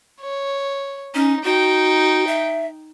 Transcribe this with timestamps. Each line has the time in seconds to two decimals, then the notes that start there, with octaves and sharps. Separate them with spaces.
0.21 C#5
1.15 C#4 D#4
1.45 D#4 F#4 G5
2.27 E5